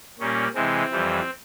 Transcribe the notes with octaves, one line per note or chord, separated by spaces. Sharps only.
A#2 G3 A#3 C#4
C3 E3 G#3 C4
F2 E3 G3